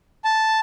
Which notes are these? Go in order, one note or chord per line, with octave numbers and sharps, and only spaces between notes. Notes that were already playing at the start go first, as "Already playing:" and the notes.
A5